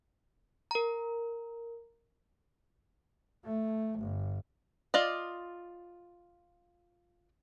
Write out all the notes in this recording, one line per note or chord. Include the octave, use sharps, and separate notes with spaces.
A#4 A#5
A3
G1
F4 D5 D#5